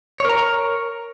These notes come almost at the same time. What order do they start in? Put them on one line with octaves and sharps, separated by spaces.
C#5 A#4 A#5